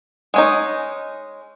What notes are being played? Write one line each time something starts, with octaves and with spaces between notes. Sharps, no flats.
G#3 C#4 D#4